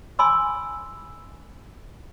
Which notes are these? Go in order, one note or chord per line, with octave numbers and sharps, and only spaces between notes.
G#5 B5 C6 D6 E6